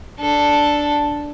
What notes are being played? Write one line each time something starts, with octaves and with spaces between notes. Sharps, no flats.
D4 A4